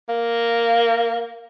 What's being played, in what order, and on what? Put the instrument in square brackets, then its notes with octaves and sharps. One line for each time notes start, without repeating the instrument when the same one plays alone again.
[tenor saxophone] A#3